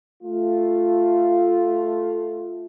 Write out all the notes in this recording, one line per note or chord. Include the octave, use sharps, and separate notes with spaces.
A3 F4